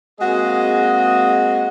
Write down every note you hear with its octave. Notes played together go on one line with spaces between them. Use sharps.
G#3 A#3 C4 F#4 G#4 D#5